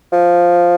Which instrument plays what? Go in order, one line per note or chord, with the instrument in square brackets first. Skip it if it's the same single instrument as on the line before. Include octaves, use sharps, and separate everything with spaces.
[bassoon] F3